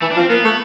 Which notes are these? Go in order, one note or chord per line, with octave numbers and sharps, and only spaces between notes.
E3 A3
D4
F3
C4
A#3 B3
A3